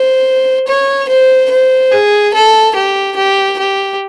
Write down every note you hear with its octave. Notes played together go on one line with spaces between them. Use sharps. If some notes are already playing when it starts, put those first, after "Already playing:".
Already playing: C5
C#5
C5
C5
G#4
A4
G4
G4
G4